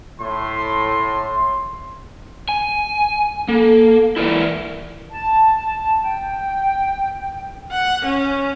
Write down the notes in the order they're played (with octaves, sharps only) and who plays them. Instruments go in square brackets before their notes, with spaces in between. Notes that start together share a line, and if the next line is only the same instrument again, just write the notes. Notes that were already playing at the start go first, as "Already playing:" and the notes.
[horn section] A2 C6
[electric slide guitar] G#5
[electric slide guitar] A#3 [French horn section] A4
[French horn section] E3 [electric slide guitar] E4 A#4 D5
[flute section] A5
A5
G5
[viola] F#5
C#4